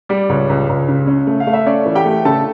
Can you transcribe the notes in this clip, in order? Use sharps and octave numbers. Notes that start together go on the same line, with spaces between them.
G3 D5
C#2 C#5
C#2
C#2
C#3
C#4
A3
F5
A3
E5
C#4 D5
E3
G4 G5
A3
C#3 A4 A5